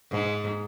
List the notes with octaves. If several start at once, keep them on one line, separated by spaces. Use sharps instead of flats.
G#2